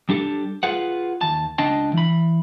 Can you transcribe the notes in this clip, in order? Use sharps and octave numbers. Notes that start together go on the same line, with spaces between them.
G3 D4 G4 A4
F4 G#4 B4 F#5
D#2 A5
C#2 D4 D#5 G5 A5
E3 B5